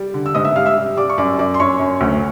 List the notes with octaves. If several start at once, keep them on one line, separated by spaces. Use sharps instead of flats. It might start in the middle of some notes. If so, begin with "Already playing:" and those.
Already playing: G3 D5
D3
E6
G#2 D#5 D#6
E5 E6
G3 F5 F6
E5 E6
G3
G3 D5 D6
C#6
F#2 D5 D6
F#2 D5 D6
C6
F#2 C#5 C#6
F#2
D2